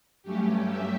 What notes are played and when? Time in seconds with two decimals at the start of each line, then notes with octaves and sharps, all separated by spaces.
0.23 G2 F#3 A3 C#4 G4
0.67 E5